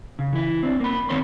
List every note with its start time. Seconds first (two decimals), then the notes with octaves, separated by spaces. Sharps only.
0.19 C#3
0.33 E3 E4
0.63 C4 D4
0.80 A#3 B5
1.09 D2 D#3 C4 C#5 B5 C6